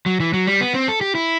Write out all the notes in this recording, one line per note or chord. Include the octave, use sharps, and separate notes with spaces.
F#3
E3
F#3
G3
B3
C4
A4
G4
E4